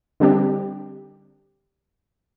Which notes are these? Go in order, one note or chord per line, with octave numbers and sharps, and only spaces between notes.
D3 G3 C4 D4 G4